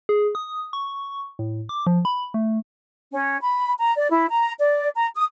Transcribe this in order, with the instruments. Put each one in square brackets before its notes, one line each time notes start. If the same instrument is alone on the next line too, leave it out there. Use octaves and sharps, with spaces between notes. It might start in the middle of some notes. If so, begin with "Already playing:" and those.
[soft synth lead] G#4
D#6
C#6
A2
D6
F3
B5
A3
[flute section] C#4
B5
A#5
D5
E4
A#5
D5
A#5
D#6